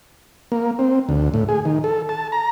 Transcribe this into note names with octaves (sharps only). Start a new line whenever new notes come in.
A#3
C4
D2
A2
G#4
D#3
A4
A5
A#5